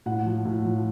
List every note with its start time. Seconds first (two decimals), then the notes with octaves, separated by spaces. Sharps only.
0.06 A2 F#5
0.26 F3
0.45 A2
0.65 F3